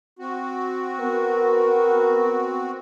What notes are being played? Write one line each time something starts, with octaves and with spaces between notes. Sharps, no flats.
C4 F#4
B3 A#4